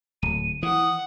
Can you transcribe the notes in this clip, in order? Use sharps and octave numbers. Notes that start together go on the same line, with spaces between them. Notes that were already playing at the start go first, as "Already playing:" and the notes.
D1 D#7
E3 F#5 D#6